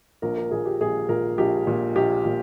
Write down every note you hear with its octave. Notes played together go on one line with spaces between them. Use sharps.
A#1 A#4
A#4
A#2 G#4
G4
A#1 G#4
A#2 A#4
A#1 G4
A#2
A#1 G4
A#2